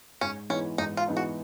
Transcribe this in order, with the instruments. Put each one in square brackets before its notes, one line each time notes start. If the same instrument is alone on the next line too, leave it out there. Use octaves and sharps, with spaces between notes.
[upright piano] G#2 [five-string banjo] C#4
[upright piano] E3 G#3 B3 D#4 [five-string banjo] C#4
[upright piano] G#2 [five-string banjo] D#4
[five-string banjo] F4
[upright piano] E3 G#3 B3 D#4
[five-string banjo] F#4